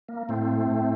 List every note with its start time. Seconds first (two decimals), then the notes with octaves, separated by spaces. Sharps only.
0.09 A#3
0.29 A2 A3 C4
0.71 A2